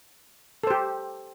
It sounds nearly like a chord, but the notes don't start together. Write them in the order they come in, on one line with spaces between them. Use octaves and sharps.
A4 C5 G4